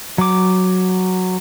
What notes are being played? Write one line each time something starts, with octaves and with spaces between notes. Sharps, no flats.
F#3 D6